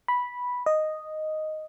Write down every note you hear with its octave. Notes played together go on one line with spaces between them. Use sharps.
B5
D#5